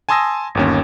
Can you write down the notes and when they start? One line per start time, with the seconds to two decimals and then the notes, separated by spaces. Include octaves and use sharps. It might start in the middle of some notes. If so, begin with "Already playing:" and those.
0.09 G#5 A5 C6 D#6 E6 A#6
0.55 G1 D#2 C#4